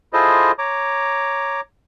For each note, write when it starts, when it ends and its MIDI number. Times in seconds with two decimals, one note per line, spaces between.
0.13 0.52 64
0.13 0.52 65
0.13 0.52 68
0.13 0.52 69
0.13 0.52 72
0.13 0.52 75
0.59 1.61 73
0.59 1.61 82
0.59 1.61 86